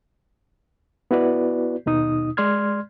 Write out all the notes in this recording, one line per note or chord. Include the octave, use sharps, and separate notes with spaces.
B3 E4 F#4 B4 D5
D#2 B2 D#4 D#6
G#3 D5 C6 F6 G#6